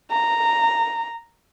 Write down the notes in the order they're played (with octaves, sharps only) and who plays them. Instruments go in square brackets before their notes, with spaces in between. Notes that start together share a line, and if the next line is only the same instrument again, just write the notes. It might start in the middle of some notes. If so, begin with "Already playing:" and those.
[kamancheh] A#5